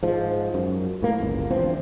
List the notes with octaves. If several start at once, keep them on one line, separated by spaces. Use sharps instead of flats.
G#2 F3
F#2
A2 A#3
G1 C#2
D3 E3 F3 C4